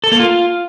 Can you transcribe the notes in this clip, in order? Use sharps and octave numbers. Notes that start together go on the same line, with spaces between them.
A4
A#3
F4